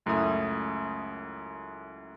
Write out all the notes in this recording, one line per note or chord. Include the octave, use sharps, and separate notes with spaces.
C#2 F#2 A3 E4 E5 D#6